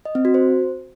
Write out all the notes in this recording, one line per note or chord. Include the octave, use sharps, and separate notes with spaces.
D#5
C4
F#4
C5